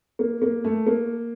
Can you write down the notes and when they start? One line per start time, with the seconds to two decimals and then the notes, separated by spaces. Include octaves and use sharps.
0.19 A#3
0.42 A#3
0.64 A3
0.87 A#3